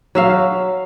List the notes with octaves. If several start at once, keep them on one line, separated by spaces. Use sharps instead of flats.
F#3 E5 F5